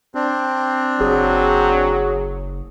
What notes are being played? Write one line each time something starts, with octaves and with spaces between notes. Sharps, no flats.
C4 D4
F#1 F#3 G#4